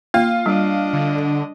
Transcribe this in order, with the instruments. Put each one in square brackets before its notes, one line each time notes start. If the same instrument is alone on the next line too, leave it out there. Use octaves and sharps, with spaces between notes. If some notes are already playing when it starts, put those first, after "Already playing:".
[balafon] A#3 [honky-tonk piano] F4
[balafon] G3 [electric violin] D4 D#5
[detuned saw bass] D3